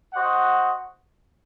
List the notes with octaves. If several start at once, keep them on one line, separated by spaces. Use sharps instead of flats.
F#4 C5 D#5 F#5